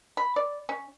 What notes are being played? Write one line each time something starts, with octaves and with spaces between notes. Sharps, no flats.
B5
D5
C#4